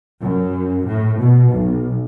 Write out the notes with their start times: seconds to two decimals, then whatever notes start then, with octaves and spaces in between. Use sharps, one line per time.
0.22 F#2
0.87 A2
1.20 B2
1.53 B1